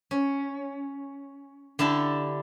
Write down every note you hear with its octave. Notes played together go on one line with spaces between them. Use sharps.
C#4
D3 E4 G4 A4